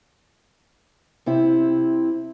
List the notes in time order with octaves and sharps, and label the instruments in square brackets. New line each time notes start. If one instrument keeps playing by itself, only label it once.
[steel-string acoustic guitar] C3 C4 E4